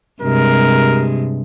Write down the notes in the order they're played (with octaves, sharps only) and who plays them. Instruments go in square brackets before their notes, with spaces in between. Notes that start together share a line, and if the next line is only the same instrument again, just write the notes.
[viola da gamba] G2 C3 G#3 [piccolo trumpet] A#4